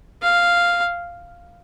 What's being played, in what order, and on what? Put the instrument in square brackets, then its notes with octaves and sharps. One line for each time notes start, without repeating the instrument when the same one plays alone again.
[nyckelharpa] F5